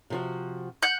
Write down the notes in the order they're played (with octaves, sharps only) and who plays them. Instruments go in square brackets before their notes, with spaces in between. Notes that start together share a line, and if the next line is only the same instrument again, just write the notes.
[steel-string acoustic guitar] C3 F3 F#4
[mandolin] F#5 G6